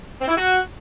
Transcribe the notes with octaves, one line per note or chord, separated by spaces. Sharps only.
C4
E4
F#4